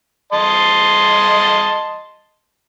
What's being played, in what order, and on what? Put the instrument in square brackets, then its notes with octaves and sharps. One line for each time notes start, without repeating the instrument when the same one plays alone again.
[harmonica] D#5 A5 C6